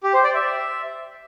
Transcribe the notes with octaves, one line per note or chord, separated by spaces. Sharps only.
G4
C5
D5
E5